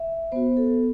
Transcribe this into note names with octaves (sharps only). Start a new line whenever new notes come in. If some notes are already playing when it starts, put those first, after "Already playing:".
Already playing: E5
B3 F#4 C5
A4